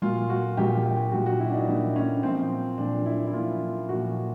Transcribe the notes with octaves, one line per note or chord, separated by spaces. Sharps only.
A#2 F#3 F4
F#4
A#2 F#3 G4
G4
A#2 F#3 F#4
F#4
E4
D4
D#4
A#2 F#3 D#4
C#4
A#2 F3 C4
A#2 F3 D4
E4
E4
A#2 F3 F4
A#2 F3 F#4